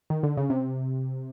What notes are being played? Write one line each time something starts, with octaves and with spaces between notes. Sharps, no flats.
D#3
D3
C#3
C3